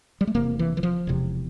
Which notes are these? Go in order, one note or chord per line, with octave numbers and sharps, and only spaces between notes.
G3
A3
E1 E2 C3 A#3
E3
E3
F3
E1 E2 C3